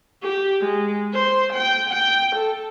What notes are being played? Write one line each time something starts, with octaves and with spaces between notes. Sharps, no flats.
G4
G#3
C5
G5
G5
A4